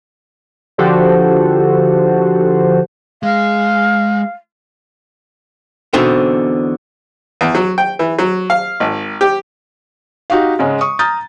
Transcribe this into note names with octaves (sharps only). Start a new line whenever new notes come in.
D3 F3 F#4 G4 A4 C5
G#3 F5
E2 B2 D3 C4 D#4 C5
E2
F#3
G5
E3
F#3
F5
G#1
G4
D#4 F#4 G4 F5
G#2 C#3 G#3
C#6 D#6
A#5 D#6 F6 G6 A6